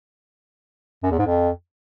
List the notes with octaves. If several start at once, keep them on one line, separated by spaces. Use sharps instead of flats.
F#2
E2
G#2
F2